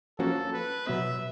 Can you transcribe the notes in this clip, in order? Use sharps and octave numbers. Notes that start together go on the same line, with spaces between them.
F3 A#3 C#4 F#4 A4
B4
B2 F#3 B3 E5